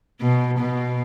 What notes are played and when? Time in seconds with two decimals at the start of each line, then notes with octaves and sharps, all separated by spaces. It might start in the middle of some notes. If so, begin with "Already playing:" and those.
0.21 B2
0.59 B2